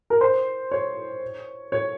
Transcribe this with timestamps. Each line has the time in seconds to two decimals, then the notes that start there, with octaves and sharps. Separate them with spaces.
0.10 A#4
0.21 C5
0.71 C#5
1.72 C#5